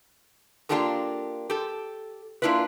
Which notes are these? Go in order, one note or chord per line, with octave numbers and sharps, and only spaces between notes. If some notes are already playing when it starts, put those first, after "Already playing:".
A#3 D4 F4 G4 A4 A#4
G4 A4
A#3 D4 E4 F4 B4